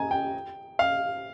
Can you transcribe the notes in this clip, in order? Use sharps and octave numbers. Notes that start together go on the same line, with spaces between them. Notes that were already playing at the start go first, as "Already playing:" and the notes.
Already playing: G#5 A#5
G5
F5